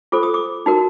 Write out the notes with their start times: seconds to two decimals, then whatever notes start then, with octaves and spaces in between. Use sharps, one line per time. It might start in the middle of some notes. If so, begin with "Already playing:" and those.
0.12 F4 A4 C5 D6
0.23 D#6
0.34 D6
0.66 D#4 F#4 A#4